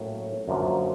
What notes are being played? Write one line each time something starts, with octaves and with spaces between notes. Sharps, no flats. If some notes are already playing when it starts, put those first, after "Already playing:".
Already playing: A2 F#3 A#3 C#4
F#2 D3 F3 A#3